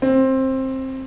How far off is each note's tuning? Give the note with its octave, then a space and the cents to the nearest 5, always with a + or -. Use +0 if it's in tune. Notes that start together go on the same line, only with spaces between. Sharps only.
C4 +15